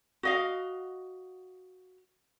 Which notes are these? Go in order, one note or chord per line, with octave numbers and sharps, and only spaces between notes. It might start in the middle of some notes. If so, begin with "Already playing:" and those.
F#4 D#5 F5